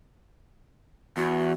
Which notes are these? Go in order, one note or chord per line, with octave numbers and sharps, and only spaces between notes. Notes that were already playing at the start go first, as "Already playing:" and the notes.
E2 F#4